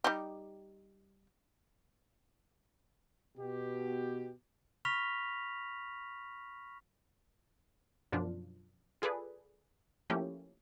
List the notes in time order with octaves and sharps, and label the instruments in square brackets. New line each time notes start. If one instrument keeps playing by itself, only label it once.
[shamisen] G3 D#4 G4
[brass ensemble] B2 G4
[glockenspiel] B5 C#6 F6 A#6 B6 F7
[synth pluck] F#2 B2 F3 D4 F4
F4 G#4 A4 B4 D5
F3 A3 A#3 C#4 E4 G4